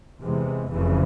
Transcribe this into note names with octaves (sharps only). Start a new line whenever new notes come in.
E2 C3 E3 G#3
F1 F2 C#3 E3